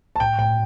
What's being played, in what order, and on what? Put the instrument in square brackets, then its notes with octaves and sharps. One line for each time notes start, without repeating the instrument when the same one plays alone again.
[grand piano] A5
[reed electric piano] A2 [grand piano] G5
[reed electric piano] A2 [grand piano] G5